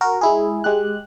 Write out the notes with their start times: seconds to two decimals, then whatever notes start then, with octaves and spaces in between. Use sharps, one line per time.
0.01 F#4 A#4
0.21 G#3 E4 G#4
0.64 G#3 G4 F#6